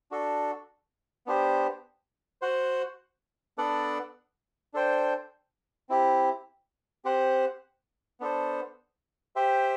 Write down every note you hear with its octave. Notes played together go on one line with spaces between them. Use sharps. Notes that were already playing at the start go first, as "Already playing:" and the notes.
D4 F#4 A4
B3 D4 G4 C5
F#4 C5 F#5
B3 D4 A4 D5 F#5
D4 A4 C5 G5
C4 E4 G4
C4 G4 C5 F#5
B3 D4 A4 C5
G4 C5 E5 G5